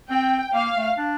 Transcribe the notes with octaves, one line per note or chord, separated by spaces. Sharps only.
C4 G5
A#3 F5
A3
D4